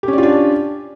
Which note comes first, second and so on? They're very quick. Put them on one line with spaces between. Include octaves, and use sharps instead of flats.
G4 C#4 D5 F4 D4